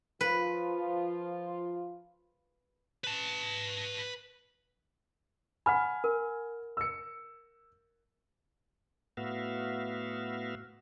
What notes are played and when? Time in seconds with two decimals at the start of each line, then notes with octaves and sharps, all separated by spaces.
0.21 F3 F4 B4
3.04 B4 A5
5.66 F#5 G#5 B5 F6
6.04 A#4
6.77 E6 C#7
9.17 A2 B3 F#4 E5 F5